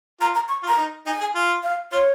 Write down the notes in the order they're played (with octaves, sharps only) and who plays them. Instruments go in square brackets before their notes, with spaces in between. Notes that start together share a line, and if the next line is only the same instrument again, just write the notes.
[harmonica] F4 [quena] A#5
[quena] A#5
C#6
[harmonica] F4
[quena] A#5
[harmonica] D#4
[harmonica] D#4 [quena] G#5
[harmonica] G#4
F4
[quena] F5
[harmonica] F4 [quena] C#5